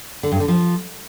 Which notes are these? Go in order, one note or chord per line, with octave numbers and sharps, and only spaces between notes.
D3
G2
D3
F3